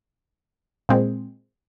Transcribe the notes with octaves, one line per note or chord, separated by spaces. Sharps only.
A#2 G#3 C4